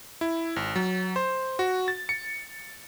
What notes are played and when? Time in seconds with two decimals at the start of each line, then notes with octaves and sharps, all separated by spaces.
0.21 E4
0.56 G#1
0.76 F#3
1.16 C5
1.59 F#4
1.88 A6
2.09 C#7